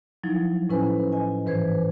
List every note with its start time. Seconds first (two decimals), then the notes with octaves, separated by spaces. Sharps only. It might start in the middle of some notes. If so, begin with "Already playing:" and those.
0.24 F3 F#3 D#4 E4
0.69 A2 C#4 E4 B4 C5 G#5
1.12 D#5 G#5
1.46 G#2 E3 B4 C5 G#6